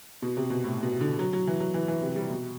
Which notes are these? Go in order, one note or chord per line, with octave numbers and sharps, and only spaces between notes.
B2
C3
B2
A2
B2
D3
F#3
F#3
E3
F#3
E3
E3
C3
G3
B2